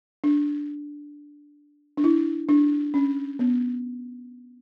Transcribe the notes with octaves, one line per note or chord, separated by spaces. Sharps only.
D4
D4
E4
D4
C#4
B3